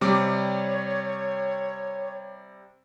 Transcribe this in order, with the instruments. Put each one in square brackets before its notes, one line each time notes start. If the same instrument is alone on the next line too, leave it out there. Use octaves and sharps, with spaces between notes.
[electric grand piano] C3 G3 D6 [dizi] C#5